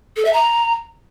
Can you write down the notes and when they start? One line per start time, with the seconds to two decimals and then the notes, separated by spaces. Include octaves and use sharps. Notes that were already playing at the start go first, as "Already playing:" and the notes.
0.17 A4
0.25 E5
0.33 A#5